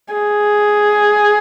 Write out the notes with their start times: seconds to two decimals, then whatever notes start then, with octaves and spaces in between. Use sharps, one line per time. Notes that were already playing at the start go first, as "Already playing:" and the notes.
0.13 G#4